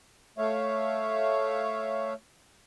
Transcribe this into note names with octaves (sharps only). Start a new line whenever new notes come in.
A3 C#5 E5 F5